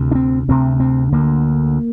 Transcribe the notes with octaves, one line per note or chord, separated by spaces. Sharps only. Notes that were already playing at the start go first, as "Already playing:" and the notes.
Already playing: D2 C3
D4
C4
D2 C3 C4
C4
D2 D3 A#3